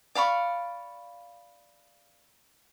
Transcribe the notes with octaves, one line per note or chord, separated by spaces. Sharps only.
D5 F5 B5 C#6